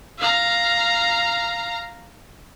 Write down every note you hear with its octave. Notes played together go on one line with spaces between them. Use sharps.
F5 A#5